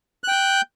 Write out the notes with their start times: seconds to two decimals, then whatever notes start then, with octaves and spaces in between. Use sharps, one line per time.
0.24 F#6
0.28 G5
0.32 G6